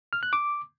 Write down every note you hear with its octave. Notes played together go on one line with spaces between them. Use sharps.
F6
F#6
D6